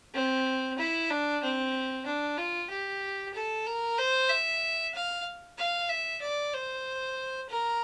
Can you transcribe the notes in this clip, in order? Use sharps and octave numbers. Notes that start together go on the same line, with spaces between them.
C4
E4
D4
C4
D4
F4
G4
A4
A#4
C5
E5
F5
F5
E5
D5
C5
A#4